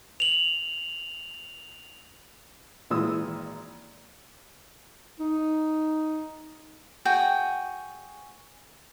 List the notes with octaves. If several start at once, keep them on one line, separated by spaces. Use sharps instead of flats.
F7 F#7
G#1 A#2 E3 G#3 D#6 E6
D#4
F#4 G#4 G5